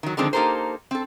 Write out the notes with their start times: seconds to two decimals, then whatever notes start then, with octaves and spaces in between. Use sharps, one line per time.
0.03 D#3 F#3
0.17 D3 D#3 F3 G#3 C4 D4
0.33 A#3 D#4 G4 A4 A#4 C5
0.91 C4 A4